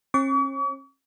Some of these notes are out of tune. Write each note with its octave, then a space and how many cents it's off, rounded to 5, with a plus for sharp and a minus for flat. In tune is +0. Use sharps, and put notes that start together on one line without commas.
C#4 -45 C#6 +45